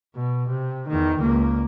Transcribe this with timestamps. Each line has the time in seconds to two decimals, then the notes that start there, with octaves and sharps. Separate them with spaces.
0.15 B2
0.49 C3
0.89 E2 D#3
1.19 C#2 A#3